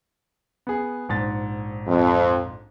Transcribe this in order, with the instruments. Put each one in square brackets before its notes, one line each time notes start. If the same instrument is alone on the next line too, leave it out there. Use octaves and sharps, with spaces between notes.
[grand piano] B3 G#4
A#1 G#2 A6
[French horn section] F2